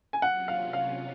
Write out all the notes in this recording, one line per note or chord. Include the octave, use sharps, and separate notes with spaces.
G#5
C3 F#3 C#4 F4 F#5
F5
F5